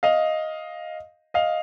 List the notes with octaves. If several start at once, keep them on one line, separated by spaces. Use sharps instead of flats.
D#5 F5
D#5 F5